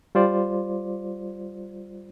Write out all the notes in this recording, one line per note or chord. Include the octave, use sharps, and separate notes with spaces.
G3 F4 C5 D5